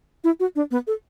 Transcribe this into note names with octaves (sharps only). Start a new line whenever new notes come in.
E4
F#4
D4
B3
A4